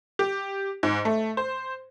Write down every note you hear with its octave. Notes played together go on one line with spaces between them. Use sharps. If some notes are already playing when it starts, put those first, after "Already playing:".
G4
G#2
A3
C5